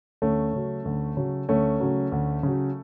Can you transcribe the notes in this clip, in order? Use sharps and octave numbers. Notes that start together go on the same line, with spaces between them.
D2 A3 C#4
C#3 F#3
D2
C#3 F#3
D2 A3 C#4
C#3 F#3
D2
C#3 F#3